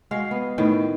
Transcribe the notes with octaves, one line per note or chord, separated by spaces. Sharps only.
G#3 F#4 F5
B3
A2 D#3 B4